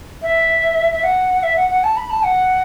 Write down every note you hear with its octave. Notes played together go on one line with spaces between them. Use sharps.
E5
E5
F#5
E5
F#5
F#5
A5
B5
A5
F#5